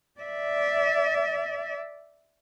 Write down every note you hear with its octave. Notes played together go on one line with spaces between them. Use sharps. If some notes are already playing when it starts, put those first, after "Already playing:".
D5 E5